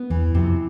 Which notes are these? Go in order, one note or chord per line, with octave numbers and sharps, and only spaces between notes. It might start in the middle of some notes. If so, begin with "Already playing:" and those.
Already playing: B3
E2 E3
F2 C3